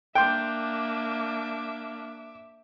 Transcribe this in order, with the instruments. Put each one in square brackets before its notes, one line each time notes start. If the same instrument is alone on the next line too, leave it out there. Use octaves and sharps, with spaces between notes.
[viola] A#3 D4 [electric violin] E5 D6 [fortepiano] G5 C6 [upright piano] G6